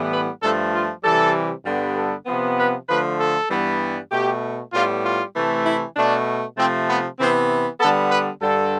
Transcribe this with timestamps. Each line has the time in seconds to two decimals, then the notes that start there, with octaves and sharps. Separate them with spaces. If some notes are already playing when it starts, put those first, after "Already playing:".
Already playing: A2 E3 G3 B3
0.12 B4
0.42 G2 F3 A3 A4
0.73 F4
1.03 C3 E3 G3 A4
1.65 G2 D3 G3 B3
1.97 A4
2.26 C3 F3 B3
2.58 B4
2.88 D3 F3 A3 B4
3.19 A4
3.50 G2 E3 G3 B3
4.12 B2 A3 G4
4.73 A2 G3 B3 F4
5.04 F4
5.35 C3 E3 A3
5.66 E4
5.95 B2 A3 D4
6.57 C3 F3 A3 C4
6.88 B3
7.18 C3 E3 B3 C4
7.80 D3 G3 B3 A4
8.11 B4
8.42 G2 D3 G3 A4